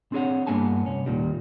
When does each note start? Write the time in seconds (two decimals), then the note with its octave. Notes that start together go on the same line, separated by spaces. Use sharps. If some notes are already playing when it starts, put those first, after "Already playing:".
0.12 C4 D4 G#4 C#5 F#5
0.47 G2 E3 A#3 B3 G#5 A5
0.86 C2 C#4
1.06 D#2 A#2 D#3 G3